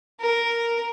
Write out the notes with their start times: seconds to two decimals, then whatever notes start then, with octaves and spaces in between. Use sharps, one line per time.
0.21 A#4